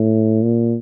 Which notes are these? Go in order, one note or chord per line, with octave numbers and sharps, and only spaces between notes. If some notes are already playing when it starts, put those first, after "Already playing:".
Already playing: A2
A#2